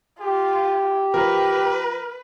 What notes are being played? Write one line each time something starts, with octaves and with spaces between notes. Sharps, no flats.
F4 G4
F3 A#4 B4